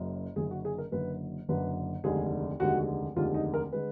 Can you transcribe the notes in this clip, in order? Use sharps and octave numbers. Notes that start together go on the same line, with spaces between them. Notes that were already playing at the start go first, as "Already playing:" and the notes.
Already playing: F#1 F#2
F#1 F#2 D3 G#4
F#4
G#4
A#4
F#1 F#2 D3 B4
F#1 F#2 D3 B4
F1 D#2 D3 G#3 G#4
F1 D#2 D3 G#3 F#4
F1 D#2 D3 G#3 F4
D#4
A#4
D3 G#3 B4